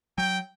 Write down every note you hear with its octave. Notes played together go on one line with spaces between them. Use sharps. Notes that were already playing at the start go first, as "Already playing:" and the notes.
F#3 G5